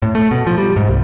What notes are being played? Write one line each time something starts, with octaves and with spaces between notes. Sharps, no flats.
A2
A3
B2
F3
G3
G#2
C2